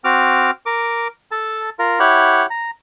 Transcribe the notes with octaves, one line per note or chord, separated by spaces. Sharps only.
C4 F#4 D6 F6
A#4 D6
A4 A5
F4 A#4
E4 G4 C#5 F#5
A#5